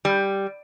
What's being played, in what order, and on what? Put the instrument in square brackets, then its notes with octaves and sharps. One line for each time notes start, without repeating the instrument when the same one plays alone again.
[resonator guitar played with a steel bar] G3